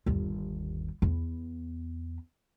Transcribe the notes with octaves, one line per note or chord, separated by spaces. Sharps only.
G1 D#2
E2 B3